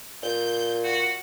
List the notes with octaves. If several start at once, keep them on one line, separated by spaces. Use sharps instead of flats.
A#2 G6
F#4